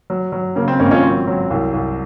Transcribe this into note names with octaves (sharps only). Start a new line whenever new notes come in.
F#3
F#3
C#3 A#3
C4
G#1 A#3 C#4
C#4 F4
F#3 C4
F#3
C2
C2